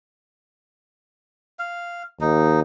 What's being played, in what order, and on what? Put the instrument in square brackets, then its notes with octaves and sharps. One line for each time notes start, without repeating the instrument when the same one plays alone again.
[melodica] F5
[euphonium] D#2 [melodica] D#4